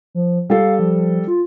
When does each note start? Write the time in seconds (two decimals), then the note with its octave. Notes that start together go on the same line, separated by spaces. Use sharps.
0.15 F3
0.50 G3 A4 F5
0.79 F3
1.28 F4